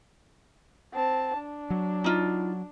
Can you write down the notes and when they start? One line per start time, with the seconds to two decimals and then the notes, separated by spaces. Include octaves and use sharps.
0.93 C4 A5
1.38 D4
1.70 F#3
2.04 D#4 F4